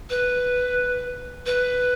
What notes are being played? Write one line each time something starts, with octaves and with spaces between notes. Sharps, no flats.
B4
B4